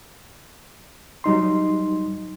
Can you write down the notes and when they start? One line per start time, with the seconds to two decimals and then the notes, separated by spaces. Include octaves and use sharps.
1.24 F#3 G3 D#4 C6